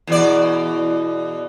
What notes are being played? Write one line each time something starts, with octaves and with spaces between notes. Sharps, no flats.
E2 B2 D5